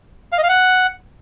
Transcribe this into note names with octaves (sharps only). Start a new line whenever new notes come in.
F5
D#5
F5
F#5